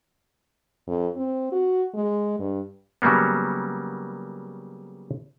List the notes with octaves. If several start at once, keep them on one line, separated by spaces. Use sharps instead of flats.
F2
C4
F#4
G#3
G2
C#3 F#3 G3 A#3 B3